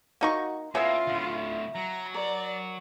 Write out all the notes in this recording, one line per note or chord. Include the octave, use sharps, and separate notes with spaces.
A#3 D#4 F#4 F#5 C#6
C#3 A#3 B3 E4 F4 E5 F5
D2 A2
F#3 A#5
A#4 D5